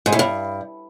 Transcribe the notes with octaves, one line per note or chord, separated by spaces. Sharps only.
G#2
A2
G2